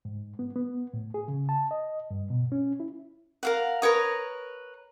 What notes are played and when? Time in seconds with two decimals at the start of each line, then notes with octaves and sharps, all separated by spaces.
0.05 G#2
0.39 B3
0.56 B3
0.94 A2
1.14 G#4
1.28 C#3
1.49 A5
1.71 D#5
2.11 G2
2.30 B2
2.52 C#4
2.80 E4
3.43 A#4 F5 F#5
3.82 A#4 B4 C#5 D#6